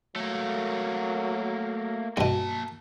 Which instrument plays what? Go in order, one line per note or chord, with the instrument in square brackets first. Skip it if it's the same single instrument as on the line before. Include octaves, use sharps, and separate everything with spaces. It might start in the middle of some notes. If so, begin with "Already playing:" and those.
[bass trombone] F#3 [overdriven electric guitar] A3 A#3
[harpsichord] G2 B2 [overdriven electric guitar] A#3 A5